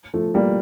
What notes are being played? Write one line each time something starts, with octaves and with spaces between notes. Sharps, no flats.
F3 A3
G3 A#3